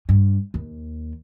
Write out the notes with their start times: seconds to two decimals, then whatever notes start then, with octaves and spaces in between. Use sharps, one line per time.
0.09 G2
0.54 D#2